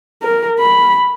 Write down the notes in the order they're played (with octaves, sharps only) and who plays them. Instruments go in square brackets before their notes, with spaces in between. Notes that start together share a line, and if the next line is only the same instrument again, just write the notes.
[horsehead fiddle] A#4
B5